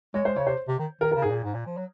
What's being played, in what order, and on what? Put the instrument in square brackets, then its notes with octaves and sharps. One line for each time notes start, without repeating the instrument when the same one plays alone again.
[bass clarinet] G#3 [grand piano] C#5
[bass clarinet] G#3 [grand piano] C5
[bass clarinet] C#3 [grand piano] C#5
[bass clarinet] C3 [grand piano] C5
[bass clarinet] C3
D#3
[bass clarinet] D#3 [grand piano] A#4
[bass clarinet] C#3 [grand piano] A#4
[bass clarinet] G#2 [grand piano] G#4
[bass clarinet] A#2
G#2
A#2
F3
F#3